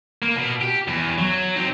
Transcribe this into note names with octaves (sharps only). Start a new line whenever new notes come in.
A#3
B2
G4
E2
F#3
C4 D#4